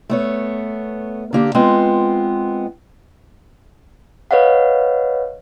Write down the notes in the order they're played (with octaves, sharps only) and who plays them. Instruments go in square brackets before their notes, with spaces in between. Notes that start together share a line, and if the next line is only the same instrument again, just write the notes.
[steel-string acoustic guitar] A3 B3 C#5
D3 A#3 G4
G#3 B3 C4 F4
[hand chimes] B4 C#5 D#5 F5 F#5